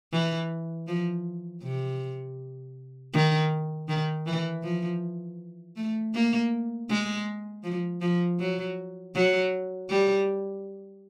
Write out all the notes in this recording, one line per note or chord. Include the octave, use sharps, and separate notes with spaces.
E3
F3
C3
D#3
D#3
E3
F3
A3
A#3
G#3
F3
F3
F#3
F#3
G3